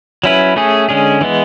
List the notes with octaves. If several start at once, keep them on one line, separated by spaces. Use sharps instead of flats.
F#3 C#4 E4 B4
A3 C#4 G#4
D3 G#3 C#4 G#4
E3 G#3 B3